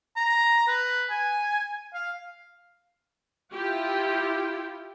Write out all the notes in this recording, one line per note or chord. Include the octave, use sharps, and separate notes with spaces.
A#5
B4
G#5
F5
E4 F4 G4